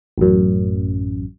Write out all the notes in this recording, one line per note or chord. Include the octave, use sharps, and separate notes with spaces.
A1 F#2